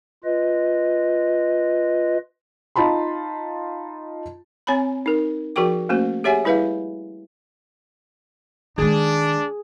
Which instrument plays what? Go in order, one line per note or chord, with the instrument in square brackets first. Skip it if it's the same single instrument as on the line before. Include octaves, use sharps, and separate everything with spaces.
[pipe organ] F4 B4 D#5
[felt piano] D#4 F4 A5 B5 C6
[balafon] C4 C#5 G#5 A#5 B5
D#4 A#4
F3 F#4 G#4 A#4 G5 D6
A3 A#3 C#4 F#4 C5
G4 G#4 C#5 E5 F#5 G#5
G3 E4 G#4 B4 E5 F5
[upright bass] D#3 G#3 [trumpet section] D4 [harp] G#4